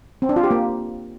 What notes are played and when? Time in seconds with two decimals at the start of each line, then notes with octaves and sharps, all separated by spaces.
0.22 C4
0.29 D4
0.36 F4
0.43 G4
0.51 A#3